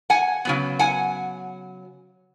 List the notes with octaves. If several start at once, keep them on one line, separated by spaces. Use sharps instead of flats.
F#5 G#5
C#3 F#3 B3
F#5 G#5